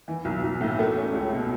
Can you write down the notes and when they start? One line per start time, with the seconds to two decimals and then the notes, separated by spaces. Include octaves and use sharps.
0.08 E3
0.25 B1
0.44 B1
0.61 A2
0.79 A3
0.97 C#4
1.14 C#2
1.33 B2